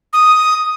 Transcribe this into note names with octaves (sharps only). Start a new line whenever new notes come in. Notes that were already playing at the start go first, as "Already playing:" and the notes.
D#6